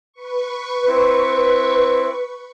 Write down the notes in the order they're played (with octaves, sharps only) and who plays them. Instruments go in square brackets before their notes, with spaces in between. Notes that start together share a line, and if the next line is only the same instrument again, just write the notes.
[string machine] B4 C#6
[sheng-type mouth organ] C4 E4